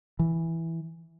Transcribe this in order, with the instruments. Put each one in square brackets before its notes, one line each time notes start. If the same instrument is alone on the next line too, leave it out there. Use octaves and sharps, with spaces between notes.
[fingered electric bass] E3